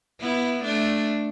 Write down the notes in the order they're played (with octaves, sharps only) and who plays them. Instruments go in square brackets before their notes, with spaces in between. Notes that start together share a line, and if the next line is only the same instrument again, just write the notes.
[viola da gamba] B3 E4
A3 D4